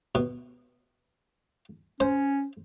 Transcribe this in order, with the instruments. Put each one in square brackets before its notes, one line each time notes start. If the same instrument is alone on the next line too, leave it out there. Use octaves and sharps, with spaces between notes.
[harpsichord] B2
[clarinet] C#4 [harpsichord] C5